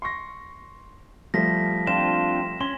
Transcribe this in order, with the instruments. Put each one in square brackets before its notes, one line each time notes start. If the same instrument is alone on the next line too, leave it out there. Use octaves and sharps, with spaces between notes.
[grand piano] C6 C#6 A#6
[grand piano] F3 G3 A3 [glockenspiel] A#6 B6
[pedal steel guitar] C4 D4 F4 [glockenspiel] E7
[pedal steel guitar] C#4 [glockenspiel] C6 [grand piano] G7